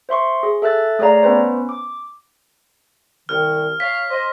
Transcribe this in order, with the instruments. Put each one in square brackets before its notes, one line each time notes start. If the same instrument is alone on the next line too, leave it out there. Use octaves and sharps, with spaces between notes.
[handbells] C5 E5 C6 C#6
G#4
A4 E5 E6 F#6 A6
A3 G#4 C#5 D5 F5 A#5
B3 C#4 B4 C5
D6
[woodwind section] C2 D#3 [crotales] F6
[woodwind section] C#5 F5 [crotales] B6
[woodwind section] C5 D#5